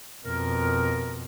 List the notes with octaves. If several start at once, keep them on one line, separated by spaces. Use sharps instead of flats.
F2 B2 A#4